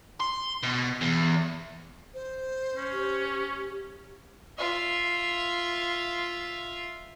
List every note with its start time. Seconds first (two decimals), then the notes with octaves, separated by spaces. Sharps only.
0.20 C6
0.64 B2
1.01 E2
2.14 C5
2.75 C#4
2.92 G4
4.58 F4 E5